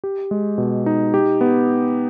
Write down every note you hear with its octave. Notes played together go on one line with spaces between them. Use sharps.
G4
G#3
B2
D#4
G4
B3